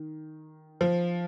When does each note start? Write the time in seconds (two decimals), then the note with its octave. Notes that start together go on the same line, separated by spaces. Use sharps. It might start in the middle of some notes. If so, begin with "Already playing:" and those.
Already playing: D#3
0.81 F3